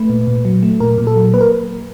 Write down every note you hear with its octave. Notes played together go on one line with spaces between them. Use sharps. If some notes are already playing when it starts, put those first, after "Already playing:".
Already playing: A3 B4
A#2
A#2
F#3
A3
A#2 A#4
A#2
A4
F#3
A#3 B4
A#4